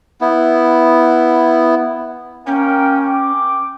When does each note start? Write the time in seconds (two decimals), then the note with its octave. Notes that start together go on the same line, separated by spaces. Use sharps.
0.21 B3 E4
2.47 A#3 C#4 A#4 G5
3.07 G5 D6